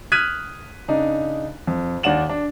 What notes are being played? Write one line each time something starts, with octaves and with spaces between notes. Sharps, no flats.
D#6 F6 F#6 G#6 B6 D#7
C#3 D4 D#4
F2
D#2 D5 F#5 E7 F#7
D4